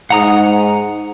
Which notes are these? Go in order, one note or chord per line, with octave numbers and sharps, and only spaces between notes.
G#2 F#5 A#5 D#6